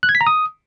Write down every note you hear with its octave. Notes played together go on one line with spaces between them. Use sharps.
F#6
G#6
B6
A#5
D#6